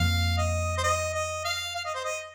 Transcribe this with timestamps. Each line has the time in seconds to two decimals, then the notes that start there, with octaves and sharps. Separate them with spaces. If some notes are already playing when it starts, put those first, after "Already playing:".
Already playing: F2 F3 A#3 F5
0.38 D#5
0.78 C5
0.84 D#5
1.14 D#5
1.45 F5
1.76 F5
1.85 D#5
1.95 C5
2.04 D#5